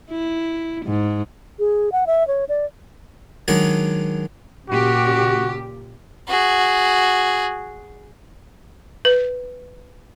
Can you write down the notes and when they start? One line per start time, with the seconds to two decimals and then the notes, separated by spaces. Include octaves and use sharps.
0.11 E4
0.85 G#2
1.59 G#4
1.92 F#5
2.07 E5
2.28 C#5
2.49 D5
3.48 D#3 F#3 G#3 D4 D#4 G#4
4.69 A#2 C#3 F#4 G4
6.28 F#4 G#4
9.05 B4